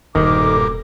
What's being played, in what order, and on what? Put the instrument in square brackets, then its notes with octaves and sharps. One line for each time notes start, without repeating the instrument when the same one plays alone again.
[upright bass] E1 [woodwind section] D2 A4 D6 [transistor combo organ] G2 A#2 A#3 [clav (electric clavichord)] D#3